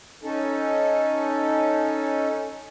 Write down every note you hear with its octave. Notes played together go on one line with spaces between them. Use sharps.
C#4 D#4 A4